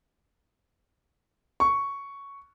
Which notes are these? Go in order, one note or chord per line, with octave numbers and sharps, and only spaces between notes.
C#6